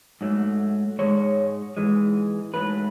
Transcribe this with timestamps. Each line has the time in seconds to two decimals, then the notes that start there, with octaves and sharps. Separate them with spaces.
0.21 G#2 F#3 A3
0.99 G#2 E3 G#3 C#5
1.77 G#2 E3 G#3
2.54 G#2 F#3 A3 B4